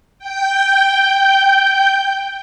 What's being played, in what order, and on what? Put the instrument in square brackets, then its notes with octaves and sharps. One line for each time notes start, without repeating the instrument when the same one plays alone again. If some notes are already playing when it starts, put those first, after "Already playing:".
[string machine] G5 G6